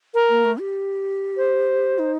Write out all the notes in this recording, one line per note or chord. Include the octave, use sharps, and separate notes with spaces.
A#4
A#3
A3
G4
C5
D#4